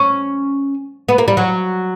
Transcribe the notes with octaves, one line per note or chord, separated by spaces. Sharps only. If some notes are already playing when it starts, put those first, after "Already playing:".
Already playing: C#4
B3
A#3
G3
F#3